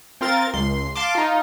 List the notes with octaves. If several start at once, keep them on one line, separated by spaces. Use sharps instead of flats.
C4 F4 A#4 A6
C#2 C6
F5 A5 C6 D6
D#4 F4